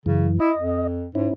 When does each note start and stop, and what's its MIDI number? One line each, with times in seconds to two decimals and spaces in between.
0.06 0.39 42
0.06 0.28 49
0.06 0.39 52
0.40 0.52 64
0.40 0.87 75
0.57 1.07 41
1.15 1.29 44
1.15 1.33 61
1.15 1.33 64